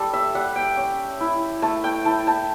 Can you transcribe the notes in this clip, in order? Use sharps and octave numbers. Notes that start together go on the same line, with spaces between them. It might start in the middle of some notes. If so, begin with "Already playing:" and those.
Already playing: G3 A4
E5
G3 F#5
G5
C#4
E4
A3 A5
G5
E4 A5
A5